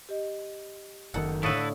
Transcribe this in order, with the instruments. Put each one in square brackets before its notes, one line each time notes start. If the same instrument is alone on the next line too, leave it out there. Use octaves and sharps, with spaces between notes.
[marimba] G4 D#5
[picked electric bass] F#1 C3 D#3 [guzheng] A4 F#5
[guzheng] A2 D3 [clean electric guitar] E4 A4 B4 [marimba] F5 C#6 D#6